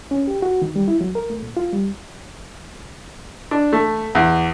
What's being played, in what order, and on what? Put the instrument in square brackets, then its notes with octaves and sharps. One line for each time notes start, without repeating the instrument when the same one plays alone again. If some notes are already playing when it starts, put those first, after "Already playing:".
[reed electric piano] C#4
G4
F#4
D#3
G3
E4
F#3
A#4
A3
A#2
F4
G3
[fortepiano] D4
A3
E2